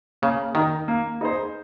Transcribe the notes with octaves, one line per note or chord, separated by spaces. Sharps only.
C#3 A#3
D#3 D#4 A#4
A#3
D#4 G#4 C5